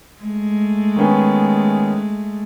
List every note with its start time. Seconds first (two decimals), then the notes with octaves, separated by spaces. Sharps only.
0.21 G#3 A3
0.96 D#3 B3 C#4